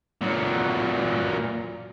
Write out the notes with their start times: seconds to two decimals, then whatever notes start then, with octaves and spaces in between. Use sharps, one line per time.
0.22 A#2 F#3